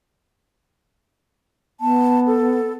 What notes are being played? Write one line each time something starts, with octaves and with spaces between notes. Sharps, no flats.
B3 A5
A4